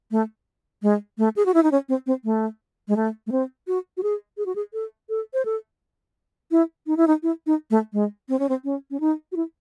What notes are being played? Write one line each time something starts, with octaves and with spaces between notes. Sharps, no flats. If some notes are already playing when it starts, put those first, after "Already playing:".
A3
G#3
A3
G#4
F#4
E4
D#4
C#4
C4
C4
A3
G#3
A3
A3
C4
F#4
F#4
G#4
G#4
F#4
G#4
A4
A4
C5
A4
E4
D#4
E4
D#4
E4
D#4
A3
G#3
C4
C#4
C4
C#4
C#4
D#4
F#4
E4